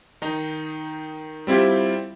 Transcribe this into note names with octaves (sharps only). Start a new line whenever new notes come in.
D#3 D#4 A#5
G3 C4 E4 F4 G4